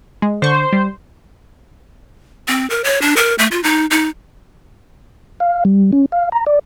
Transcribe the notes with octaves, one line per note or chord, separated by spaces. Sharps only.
G#3
D3 C5 C#6
G3
C4
A#4
C#5
D4
A#4
A3
F4
D#4
D#4
F5
G3
C#4
F5
A#5
D5